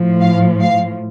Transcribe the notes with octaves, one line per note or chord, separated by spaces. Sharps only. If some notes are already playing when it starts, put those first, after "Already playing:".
Already playing: A2 F3
F5
F5